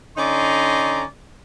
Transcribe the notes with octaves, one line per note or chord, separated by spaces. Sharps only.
D3 C#4 D#4 D5 A#5 C6